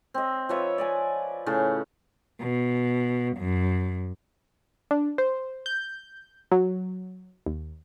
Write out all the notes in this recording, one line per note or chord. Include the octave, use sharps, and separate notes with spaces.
C4 D#5
F3 B4 C#5 E5
D5 D#5 G#5
A2 C#3 C#4 A5
B2
F#2
D4
C5
G6
F#3
D#2